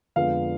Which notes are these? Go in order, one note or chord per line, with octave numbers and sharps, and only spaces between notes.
F2 D3 F3 G#3 B3 F5